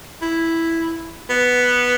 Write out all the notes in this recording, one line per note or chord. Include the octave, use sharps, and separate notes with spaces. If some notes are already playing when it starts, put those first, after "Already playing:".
E4
B3